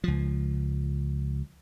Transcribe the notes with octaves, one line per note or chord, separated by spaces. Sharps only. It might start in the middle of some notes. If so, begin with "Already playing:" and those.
C#2 F3